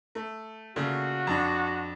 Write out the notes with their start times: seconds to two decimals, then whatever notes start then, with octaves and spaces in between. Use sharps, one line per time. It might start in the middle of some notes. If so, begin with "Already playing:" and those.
0.15 A3
0.76 A#2 C#3 A3 F#4
1.27 F2 D4